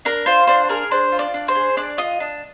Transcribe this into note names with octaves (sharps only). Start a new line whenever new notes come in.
D4 A#4
F4 C5
D4 C5
G#4 A#4
D4 C5
F4
D5
D4
C5
G#4
D4 D5
F4 D#5
D4